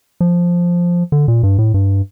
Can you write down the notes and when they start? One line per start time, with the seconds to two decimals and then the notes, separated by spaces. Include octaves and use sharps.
0.20 F3
1.12 D3
1.28 A#2
1.43 G2
1.58 A2
1.74 G2